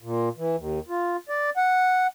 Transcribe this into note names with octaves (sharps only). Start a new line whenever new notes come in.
A#2
E3
D#2
F4
D5
F#5